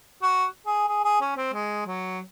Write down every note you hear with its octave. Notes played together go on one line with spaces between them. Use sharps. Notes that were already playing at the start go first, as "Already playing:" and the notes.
F#4
G#4
G#4
G#4
C#4
C4
G#3
F#3